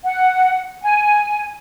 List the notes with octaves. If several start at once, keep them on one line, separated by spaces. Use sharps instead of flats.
F#5
G#5